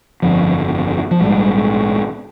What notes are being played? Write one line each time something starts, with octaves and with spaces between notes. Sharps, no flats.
G1 F2 D3 F3
F3
A#1 G#2 G3